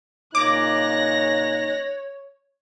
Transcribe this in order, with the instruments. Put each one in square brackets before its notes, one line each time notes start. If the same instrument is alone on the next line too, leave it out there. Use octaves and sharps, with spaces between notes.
[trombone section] A#2 C#3 D#4 [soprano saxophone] C#5 [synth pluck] D6 [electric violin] F#6 A#6